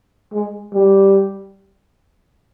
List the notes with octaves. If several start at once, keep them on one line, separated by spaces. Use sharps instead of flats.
G#3
G3